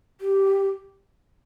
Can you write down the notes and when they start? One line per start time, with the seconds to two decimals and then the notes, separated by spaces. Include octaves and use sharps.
0.21 G4